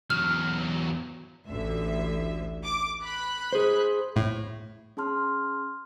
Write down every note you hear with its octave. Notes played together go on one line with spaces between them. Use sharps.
E2 F#3 F6
A1 D2 E5
D6
B5 F#6
G#4 C5
A2
C#4 G#4 A5 C6 F6